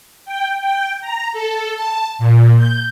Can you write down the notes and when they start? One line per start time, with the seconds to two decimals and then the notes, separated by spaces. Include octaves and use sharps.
0.25 G5
0.61 G5
1.01 A#5
1.32 A4
1.71 A5
2.19 A#2
2.57 G6